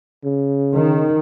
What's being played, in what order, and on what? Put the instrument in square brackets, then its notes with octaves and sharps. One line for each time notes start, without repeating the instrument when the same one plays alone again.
[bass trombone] C#3
[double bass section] D#3